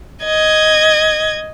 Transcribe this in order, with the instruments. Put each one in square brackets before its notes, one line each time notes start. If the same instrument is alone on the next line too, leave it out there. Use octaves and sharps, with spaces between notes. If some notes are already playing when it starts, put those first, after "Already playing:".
[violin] D#5 G#6